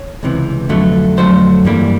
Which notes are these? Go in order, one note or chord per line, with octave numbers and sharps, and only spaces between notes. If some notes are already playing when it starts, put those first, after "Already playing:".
Already playing: C#5
C#2 C3 E3
F2 D3 F#3 A3
F2 D3 F#3 A3 C5
G2 E3 G3 A#3